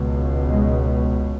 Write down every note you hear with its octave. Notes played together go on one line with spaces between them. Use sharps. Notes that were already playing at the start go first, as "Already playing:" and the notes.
Already playing: C#2 B2
G#3